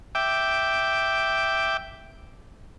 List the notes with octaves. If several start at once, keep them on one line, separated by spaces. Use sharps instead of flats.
E5 G5 D6